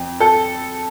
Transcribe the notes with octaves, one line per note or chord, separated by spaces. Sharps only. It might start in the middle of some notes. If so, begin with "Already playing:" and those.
Already playing: F2
A4